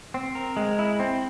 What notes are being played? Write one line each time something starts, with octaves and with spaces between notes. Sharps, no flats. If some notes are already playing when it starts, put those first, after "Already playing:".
C4
A#4
G#3
E4
C4